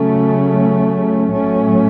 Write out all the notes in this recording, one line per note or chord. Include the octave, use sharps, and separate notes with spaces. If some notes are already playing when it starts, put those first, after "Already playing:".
Already playing: C#3 F#3 A3 C#4
A2 F#3 A3 C#4